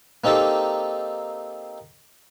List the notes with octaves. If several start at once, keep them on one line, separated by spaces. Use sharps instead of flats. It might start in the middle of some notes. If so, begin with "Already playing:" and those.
A#3 C4 D#4 G4 A4